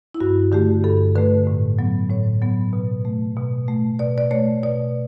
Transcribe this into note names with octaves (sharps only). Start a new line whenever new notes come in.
E4
G2 F#4
D3 A3 G4
G2 A4
D3 A3 B4
A2
F#3 B3
A2 C#5
F#3 B3
B2
A3
B2
A3
B2 D5
D5
A3 C#5
B2 D5